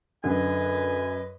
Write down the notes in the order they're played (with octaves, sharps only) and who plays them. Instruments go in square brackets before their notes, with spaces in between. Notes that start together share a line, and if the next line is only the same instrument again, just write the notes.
[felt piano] F#2 [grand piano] D3 [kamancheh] B4 D#5 [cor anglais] G#5